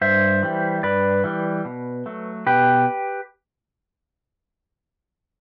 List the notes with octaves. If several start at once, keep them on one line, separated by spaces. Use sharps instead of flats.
G2 C5 E5
E3 G3
G2 B4 D5
E3 G3
B2
F#3 A3
B2 G4 B4